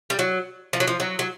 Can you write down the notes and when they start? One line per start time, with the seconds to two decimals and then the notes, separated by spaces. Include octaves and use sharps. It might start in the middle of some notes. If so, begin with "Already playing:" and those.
0.10 G3
0.19 F#3
0.73 F3
0.80 F#3
0.87 F3
1.00 F#3
1.19 F#3